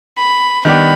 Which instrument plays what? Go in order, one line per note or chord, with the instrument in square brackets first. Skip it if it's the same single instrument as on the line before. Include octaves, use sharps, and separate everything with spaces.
[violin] B5
[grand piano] D#3 G3 B3 D4 G4 [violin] B5